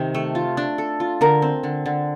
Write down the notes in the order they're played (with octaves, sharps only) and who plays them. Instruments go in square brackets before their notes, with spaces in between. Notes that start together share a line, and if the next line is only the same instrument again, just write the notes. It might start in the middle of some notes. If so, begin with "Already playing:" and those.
Already playing: [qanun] C3 D#3
A3
F4
D4
A4
F4
[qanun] D3 [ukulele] A#4
[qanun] C4
D3
D3